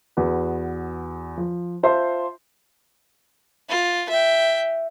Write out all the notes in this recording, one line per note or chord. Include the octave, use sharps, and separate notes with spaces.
E2 F#4 B4
F3
F4 C5 E5 A5 C6
F4
E5 G5